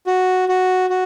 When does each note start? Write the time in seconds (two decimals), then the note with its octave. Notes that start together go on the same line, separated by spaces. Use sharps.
0.07 F#4
0.49 F#4
0.90 F#4